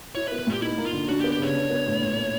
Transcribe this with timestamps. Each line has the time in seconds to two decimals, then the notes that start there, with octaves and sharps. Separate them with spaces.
0.15 E4 C#5
0.28 B4
0.32 B3
0.39 B4
0.47 A#2 G4
0.62 D#4 E4
0.78 A#3
0.86 F4
0.93 D3
1.09 D4 F#4
1.20 G4
1.24 B3
1.32 G4
1.39 C#3 C#5
1.55 D4
1.70 B3
1.86 A2
2.02 A#2
2.16 A3